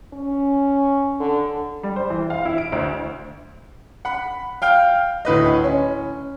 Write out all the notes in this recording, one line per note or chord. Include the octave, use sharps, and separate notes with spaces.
C#4
D3
G3
C5
E3
F5
E4
D7
D2
F#5 B5
F5 G5 F6
D2 A2 B4 D#5
C#4